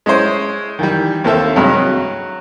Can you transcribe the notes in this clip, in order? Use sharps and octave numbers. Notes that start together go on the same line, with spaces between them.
G#3 C#4 E4 C5
D#3 E3 G3
D#2 A#3 C4 A4 E5
G2 C3 F#3 G#3
F#3